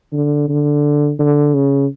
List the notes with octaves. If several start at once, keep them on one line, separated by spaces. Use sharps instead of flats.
D3
D3
D3
C#3